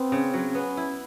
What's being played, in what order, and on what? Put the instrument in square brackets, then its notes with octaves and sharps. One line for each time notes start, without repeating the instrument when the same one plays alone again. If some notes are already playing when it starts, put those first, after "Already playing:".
Already playing: [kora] B3 [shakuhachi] C4
[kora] C#3
F#3
[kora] B3 [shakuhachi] C#4
[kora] E4